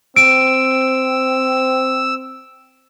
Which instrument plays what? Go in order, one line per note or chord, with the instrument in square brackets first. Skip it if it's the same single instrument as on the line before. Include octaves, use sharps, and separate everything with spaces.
[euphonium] C4 [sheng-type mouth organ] E6 [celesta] D7